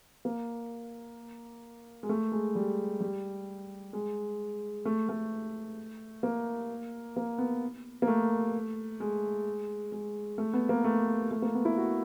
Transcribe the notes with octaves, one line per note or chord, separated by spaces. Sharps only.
A#3
G#3
A3
G#3
G3
G3
G#3
A3
A3
A#3
A#3
B3
A#3
A3
G#3
G#3
A3
B3
A#3
A3
A3
A#3
B3
E4
F#4